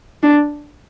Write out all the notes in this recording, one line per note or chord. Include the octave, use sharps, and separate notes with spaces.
D4